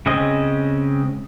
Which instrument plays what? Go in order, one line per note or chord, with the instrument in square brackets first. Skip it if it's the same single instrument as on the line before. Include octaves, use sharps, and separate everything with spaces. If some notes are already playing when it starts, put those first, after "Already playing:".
[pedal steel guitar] C#3 G#3 C4 C#4 D#5